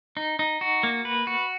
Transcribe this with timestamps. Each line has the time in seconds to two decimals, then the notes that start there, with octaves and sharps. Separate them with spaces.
0.17 D#4
0.39 D#4
0.61 F#4
0.83 A#3
1.05 B4
1.27 F#4